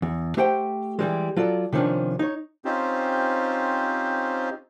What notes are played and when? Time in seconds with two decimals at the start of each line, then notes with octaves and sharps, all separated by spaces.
0.02 E2
0.37 A3 G4 C5 F#5 G5
0.99 E3 G3 G#3
1.36 F#3 F4 A4 D5
1.72 C3 D#3 F3 C#4 D4
2.19 D#4 C#5
2.65 C4 C#4 D#4 F4 G4 C5